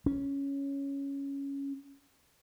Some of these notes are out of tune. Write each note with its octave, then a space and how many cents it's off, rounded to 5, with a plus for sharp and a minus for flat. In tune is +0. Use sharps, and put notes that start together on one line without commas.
C#4 +5